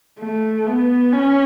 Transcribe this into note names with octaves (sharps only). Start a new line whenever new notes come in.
A3
B3
C#4